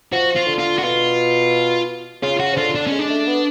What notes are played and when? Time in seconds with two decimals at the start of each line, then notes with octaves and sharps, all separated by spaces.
0.12 F3 F#4
0.36 F4
0.47 D3
0.58 F4
0.78 F#4
0.83 B2 F4
2.22 C#3 F4
2.40 F#4
2.53 F3
2.57 D3 F4
2.75 D4
2.87 C#4
2.92 G#3
2.99 D4
3.09 A3
3.27 B3